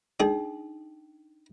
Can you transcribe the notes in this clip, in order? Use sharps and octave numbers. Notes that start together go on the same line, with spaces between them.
D4 D#4 G#4 D5 G5